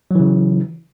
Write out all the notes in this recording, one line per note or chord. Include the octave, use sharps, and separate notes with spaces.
C#3 E3 F#3